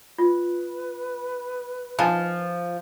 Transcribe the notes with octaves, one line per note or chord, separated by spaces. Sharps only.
F4 B4
F3 G#3 D4 D#4